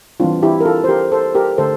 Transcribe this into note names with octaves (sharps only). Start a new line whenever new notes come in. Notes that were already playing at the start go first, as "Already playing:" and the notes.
E3 G3 C4 D4 F4
E4 G4
A#4
F4 A4
C5
G4 A#4
A4 C5
G4 A#4
D3 A3 A4 C5